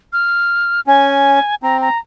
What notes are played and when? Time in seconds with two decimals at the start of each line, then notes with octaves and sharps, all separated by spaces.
0.13 F6
0.87 C#4 G#5
1.63 C4 A#5
1.81 A#5